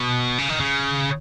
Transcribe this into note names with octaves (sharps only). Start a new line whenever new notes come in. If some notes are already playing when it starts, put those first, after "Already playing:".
Already playing: B2
C#3
D#3
C#3